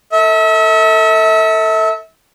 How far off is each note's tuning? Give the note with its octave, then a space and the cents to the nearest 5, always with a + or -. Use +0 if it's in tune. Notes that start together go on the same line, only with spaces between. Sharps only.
A4 +25 E5 -35